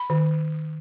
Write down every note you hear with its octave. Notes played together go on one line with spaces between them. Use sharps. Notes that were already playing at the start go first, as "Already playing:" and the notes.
Already playing: B5
D#3